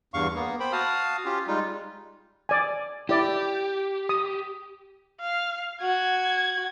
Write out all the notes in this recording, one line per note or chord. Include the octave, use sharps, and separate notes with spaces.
E2 G2 F5 C#6
A#3 B3
C5 G5 B5
F#4 F5 A5 D#6 F6
C#4 F4 G4
G3 G#3 D#4 F4
D5 G#5
E4 G4 D5
D#6
F5
F#4 G#6